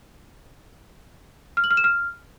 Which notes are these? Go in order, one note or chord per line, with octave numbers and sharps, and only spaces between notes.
F6
F#7
F6
E7
F6